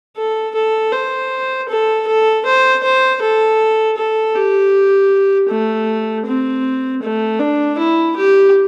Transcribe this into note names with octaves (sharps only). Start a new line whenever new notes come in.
A4
A4
C5
A4
A4
C5
C5
A4
A4
G4
A3
C4
A3
D4
E4
G4